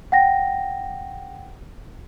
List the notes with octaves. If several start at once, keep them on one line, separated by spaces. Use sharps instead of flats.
F#5 G5 A#6